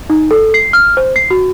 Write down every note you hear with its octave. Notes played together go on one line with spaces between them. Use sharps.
D#4
A4
C7
F6
C5
C7
F#4